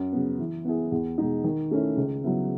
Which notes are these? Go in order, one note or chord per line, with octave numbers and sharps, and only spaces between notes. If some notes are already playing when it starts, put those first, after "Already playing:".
Already playing: F#2
C#3 F#3 B3
E3
B3 E4 G#4
E2
B2 G#3 D#4
D#3
A3 C#4 E4
C#2
C#3 F#3 B3 E4